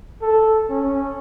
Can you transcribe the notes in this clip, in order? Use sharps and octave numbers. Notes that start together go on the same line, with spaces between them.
A4
C#4